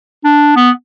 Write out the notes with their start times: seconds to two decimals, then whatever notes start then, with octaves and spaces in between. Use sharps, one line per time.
0.25 D4
0.56 B3